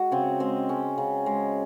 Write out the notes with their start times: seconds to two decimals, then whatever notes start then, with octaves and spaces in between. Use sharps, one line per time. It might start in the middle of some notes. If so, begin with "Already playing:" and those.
Already playing: G#3 F#4
0.12 C#3 C4
0.40 G#3 C4
0.69 G#3 C#4
0.98 C#3
1.26 G#3